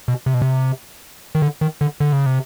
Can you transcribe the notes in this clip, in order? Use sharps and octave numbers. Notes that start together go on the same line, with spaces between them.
B2
C3
B2
C3
D#3
D3
D#3
D3
D3
C#3
C3